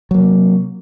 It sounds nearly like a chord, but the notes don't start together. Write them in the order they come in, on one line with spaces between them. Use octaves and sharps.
F#3 A#3 C3